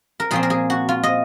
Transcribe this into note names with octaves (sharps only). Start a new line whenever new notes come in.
A#4
A#2 F3 C4 G#4
A#4
G#4
F#4
F4
D#5